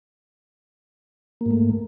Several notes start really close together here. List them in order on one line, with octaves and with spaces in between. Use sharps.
A#3 G#2 A3